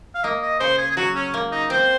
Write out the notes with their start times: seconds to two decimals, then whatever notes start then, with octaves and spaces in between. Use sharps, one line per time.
0.15 F5
0.24 A#3 D#5
0.42 D#5
0.60 C#3 C5
0.78 G#4
0.91 G#4
0.97 F#3 F#4
1.15 C#4
1.34 A#3
1.52 D#4
1.70 C4 C5